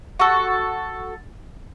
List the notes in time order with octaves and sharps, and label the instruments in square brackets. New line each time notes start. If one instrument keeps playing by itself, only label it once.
[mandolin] F#4 A4